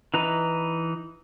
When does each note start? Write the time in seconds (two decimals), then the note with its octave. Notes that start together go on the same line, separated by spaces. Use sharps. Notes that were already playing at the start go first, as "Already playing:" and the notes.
0.14 E3 D#4 B4 A#5